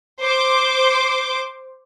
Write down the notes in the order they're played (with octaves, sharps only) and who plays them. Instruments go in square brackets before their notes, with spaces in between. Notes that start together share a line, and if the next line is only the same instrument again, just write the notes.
[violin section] C5 D6